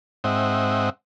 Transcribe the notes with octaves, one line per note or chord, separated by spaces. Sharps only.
G#2 C4 D#5 E5 F#5